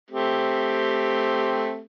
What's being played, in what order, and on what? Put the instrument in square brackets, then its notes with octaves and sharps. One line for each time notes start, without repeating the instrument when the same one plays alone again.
[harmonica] A3 C4 G4